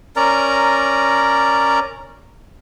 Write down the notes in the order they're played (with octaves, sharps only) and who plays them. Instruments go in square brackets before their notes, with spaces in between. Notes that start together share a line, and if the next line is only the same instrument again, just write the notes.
[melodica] C#4 A#4 D5 A#5